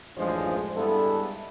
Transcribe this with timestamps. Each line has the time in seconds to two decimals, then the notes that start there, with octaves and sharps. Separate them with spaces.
0.17 A1 F#2 F3 G#3 D4 C5
0.76 G2 G#3 B3 E4 A4